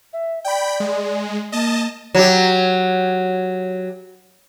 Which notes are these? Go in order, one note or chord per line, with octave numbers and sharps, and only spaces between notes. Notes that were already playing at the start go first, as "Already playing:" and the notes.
E5
D5 G5 B5
G#3
A#3 D#5 A5
F#3 G4